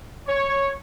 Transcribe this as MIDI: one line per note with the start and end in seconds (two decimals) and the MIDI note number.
0.27 0.73 73